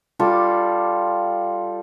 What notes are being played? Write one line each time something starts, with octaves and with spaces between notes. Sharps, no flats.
G3 F4 A4 D6